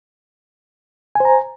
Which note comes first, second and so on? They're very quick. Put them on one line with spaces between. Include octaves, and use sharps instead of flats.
G#5 C5 A#5